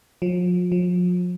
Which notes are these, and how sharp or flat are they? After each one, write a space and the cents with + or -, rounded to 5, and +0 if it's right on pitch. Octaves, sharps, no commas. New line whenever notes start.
F3 +40
F3 +40